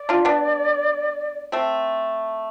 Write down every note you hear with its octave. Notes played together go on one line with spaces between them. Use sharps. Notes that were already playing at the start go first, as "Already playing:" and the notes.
Already playing: D5
D4 F4
B3 D4
A3 C4